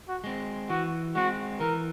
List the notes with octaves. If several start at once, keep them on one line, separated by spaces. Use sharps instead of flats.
F#4
G#3 C4
E3 F#4
G#3 C4 F#4
E3 A#4